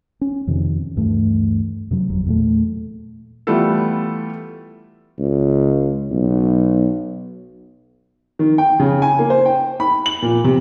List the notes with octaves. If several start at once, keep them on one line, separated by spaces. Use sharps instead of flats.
C#4
F2 C3 D#3
D2 G2 E3 A3
F#2 C3 F#3
G1 F2 F#3
E2 A#2 G#3 A3
E3 G3 A3 B3 F4 A4
C#2
B1
D#3
G5
C#3
G#5
A#3
C5
G5
B5
F#7
A#2
C3